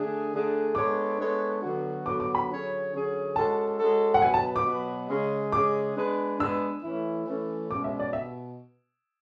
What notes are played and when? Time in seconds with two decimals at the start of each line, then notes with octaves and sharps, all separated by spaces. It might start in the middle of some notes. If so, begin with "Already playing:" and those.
Already playing: D3 A3 D4 G#4
0.32 D3 A3 D4 G#4
0.75 G#3 B3 D4 A4 C#5 D6
1.19 G#3 B3 D4 A4 C#5
1.62 D3 F#3 B3 F#4
2.06 D3 F#3 B3 F#4 D6
2.20 D6
2.35 B5
2.50 D3 F#3 C#4 G#4 C#5
2.92 D3 F#3 C#4 G#4 C#5
3.36 G#3 C#4 F#4 A4 A5
3.79 G#3 C#4 F#4 A4
4.14 F#5
4.22 B2 F#3 B3 F#4 B4 G#5
4.34 A5
4.56 D6
4.66 B2 F#3 B3 F#4 B4
5.09 C#3 G#3 C#4 G#4
5.52 C#3 G#3 C#4 G#4 D6
5.96 G#3 B3 D4 G#4 B4
6.40 G#3 B3 D4 G#4 B4 E6
6.83 E3 A3 C#4 E4
7.26 E3 A3 C#4 E4
7.70 B2 G#3 C#4 D6
7.84 E5
7.99 D5
8.13 B2 E5